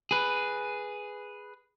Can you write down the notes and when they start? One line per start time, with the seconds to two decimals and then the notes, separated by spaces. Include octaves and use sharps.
0.11 G#4 B4